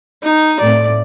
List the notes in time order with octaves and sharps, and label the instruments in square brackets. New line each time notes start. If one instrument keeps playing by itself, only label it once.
[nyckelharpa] D#4
[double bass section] A2 A3 C4 [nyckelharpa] D5